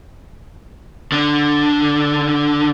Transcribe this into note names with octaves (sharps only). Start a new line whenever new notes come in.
D3 D4